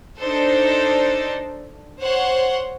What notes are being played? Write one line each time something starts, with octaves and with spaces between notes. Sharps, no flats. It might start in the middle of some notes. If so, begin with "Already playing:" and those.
D4 D#4 A4 C5
C5 C#5 F#5